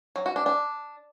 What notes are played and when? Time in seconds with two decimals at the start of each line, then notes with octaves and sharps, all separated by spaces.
0.16 F#3
0.26 F#4
0.36 D4
0.46 D4